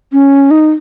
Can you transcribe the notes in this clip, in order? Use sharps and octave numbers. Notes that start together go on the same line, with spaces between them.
C#4
D#4